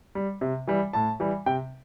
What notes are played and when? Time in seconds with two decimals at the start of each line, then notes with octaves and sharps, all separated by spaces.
0.15 G3
0.41 C3
0.67 E3 G3
0.93 A2 A5
1.20 E3 G3
1.46 C3 G5